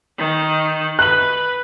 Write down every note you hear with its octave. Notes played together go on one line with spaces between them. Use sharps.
D#3
B4 F#6 F#7